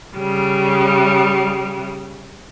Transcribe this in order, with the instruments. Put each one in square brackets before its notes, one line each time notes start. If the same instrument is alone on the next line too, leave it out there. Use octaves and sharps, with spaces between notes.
[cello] C#3 G3